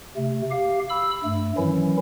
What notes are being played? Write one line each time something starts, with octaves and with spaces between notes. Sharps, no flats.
C3 A3
G4 F5
B5 E6
G2 A3
D#3 E3 F#3 C#4 E4